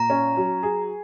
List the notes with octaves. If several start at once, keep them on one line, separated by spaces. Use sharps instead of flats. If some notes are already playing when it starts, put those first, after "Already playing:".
Already playing: A#2 A#5
C#4
F#3
G#4